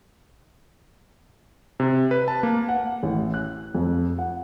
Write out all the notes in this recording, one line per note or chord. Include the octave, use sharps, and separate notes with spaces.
C3
B4
A5
A#3
F#5
A1
F#6
F2
F#5